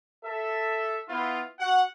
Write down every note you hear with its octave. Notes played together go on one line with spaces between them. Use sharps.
A4 E5
B3 E4 F4
F#4 F#5